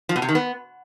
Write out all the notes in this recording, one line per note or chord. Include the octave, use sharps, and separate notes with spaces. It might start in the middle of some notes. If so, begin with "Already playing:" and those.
F3
B2
C3
D#3
B3